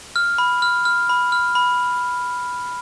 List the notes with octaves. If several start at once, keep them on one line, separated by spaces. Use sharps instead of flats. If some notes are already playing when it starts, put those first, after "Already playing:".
F6
B5
F6
F6
B5
F6
B5